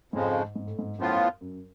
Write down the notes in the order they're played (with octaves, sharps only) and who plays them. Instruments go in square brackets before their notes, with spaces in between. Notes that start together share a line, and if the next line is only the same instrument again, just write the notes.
[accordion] F2 C#3 F3 G#3 [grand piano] G#2
[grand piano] G#2
A2
G#2
[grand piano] F#2 [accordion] A2 F3 B3 F4
[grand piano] F#2